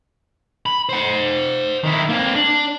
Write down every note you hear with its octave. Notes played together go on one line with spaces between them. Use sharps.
B5
C5 F#5
D#3 E4
A#3 C4
D4